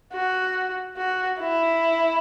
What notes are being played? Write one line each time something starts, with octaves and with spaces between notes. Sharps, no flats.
F#4
F#4
E4